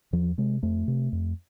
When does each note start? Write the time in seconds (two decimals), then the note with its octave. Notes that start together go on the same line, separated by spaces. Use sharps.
0.13 E2 F3
0.38 C3 G#3
0.63 F2 A3
0.88 C3
1.12 F2